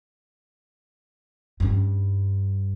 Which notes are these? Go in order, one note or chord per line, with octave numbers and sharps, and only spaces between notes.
G2 C#4